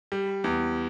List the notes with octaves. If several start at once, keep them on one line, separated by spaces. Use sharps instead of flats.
G3
E2